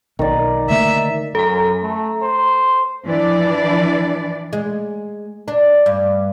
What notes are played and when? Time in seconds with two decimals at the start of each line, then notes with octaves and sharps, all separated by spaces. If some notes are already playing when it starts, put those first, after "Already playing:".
0.19 B1 D#3 D5
0.70 D3 A3 A#3 E5
1.35 F#2 A4 A#5
1.82 A3
2.22 C5
3.06 E3 F3 D4 D5
4.53 G#3
5.48 D4
5.86 G2